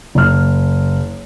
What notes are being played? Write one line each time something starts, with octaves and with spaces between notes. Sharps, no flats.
F#1 F6